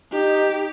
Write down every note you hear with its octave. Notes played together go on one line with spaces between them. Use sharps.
D#4 G4